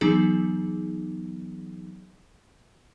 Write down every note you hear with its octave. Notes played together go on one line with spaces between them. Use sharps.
E3 F#3 B3 D#4 G#4